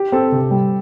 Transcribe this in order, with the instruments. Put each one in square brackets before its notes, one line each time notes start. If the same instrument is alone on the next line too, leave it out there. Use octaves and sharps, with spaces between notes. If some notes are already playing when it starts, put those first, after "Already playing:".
Already playing: [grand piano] G4
[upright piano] C4 [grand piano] A4
[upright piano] C3
G3